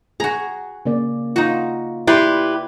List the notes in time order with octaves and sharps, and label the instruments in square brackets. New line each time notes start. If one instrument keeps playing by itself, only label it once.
[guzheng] F#4 A#5 [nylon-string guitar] G#4
[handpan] C#3 A#3 D5
[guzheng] D#4 F#4 [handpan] F4
[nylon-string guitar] E4 [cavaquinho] G4 B4 C6 [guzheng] D5